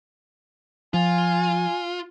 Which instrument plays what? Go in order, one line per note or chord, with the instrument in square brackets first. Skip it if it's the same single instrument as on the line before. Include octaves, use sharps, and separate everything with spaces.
[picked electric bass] F3 [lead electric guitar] F4 [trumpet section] G#5